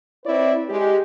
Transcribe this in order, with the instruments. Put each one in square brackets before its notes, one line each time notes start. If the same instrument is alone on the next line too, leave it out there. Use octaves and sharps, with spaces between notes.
[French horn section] C4 E4 B4 C#5 D5
G#3 G4